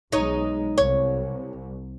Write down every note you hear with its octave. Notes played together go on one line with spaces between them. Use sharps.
B1 G#3 D#4 C#5
C2 C#5